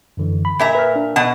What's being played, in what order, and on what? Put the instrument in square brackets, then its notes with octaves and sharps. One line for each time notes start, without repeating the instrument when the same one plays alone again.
[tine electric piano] F#2 D3 E3
B5
[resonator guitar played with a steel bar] A#2 E5 A#5
[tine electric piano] B4 F6
D4
[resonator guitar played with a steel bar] B2 F#5 A5